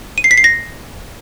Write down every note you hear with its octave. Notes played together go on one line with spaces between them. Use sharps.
D#7
C7
B6
C7
A#6